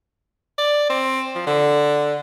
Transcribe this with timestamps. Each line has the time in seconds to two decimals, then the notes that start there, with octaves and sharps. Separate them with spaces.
0.58 D5
0.90 C4
1.35 F3
1.47 D3